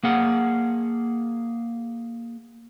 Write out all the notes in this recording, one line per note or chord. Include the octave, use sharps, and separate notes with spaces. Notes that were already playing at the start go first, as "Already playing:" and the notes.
A#3 G#4 F#5